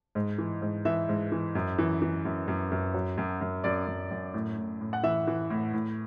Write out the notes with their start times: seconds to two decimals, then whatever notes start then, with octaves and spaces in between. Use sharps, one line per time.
0.15 G#2
0.38 E3
0.62 G#2
0.85 E3 E5
1.09 G#2
1.32 E3
1.55 F#2
1.79 E3
2.02 E3
2.25 F#2
2.48 F#2
2.71 F#2
2.94 F#3
3.18 F#2
3.41 F#2
3.64 F#2 D5
3.87 F#2
4.11 F#2
4.34 A2
4.57 A2
4.81 A2
4.93 F#5
5.03 E3 E5
5.27 E3
5.50 A2
5.73 A2